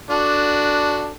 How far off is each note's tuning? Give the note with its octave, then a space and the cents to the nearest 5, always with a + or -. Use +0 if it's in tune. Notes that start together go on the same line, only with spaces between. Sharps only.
D4 +0 F#4 +0 A4 +0